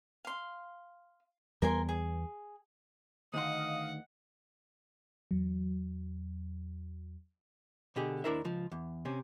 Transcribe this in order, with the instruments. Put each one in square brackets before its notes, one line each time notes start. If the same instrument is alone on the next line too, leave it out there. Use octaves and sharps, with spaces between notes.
[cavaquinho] F5 C6
[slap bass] E2 G3 B3 [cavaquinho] A#4 G#5 C6
[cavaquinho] G#4
[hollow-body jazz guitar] D2 D#3 C6 [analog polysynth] D#5 F5 [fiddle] F#5 [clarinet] D#6
[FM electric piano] E2 F#3
[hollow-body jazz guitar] B2 D3 G4 G#4
D#2 D4 E4 A#4 C5 E5
C#2 F3
E2
C3 C4 C#4